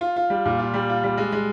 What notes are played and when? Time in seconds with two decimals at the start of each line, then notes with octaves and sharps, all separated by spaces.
0.01 F4
0.16 F4
0.30 G3
0.46 A#2
0.59 F4
0.74 G3
0.89 F4
1.04 G3
1.17 G#3
1.32 G#3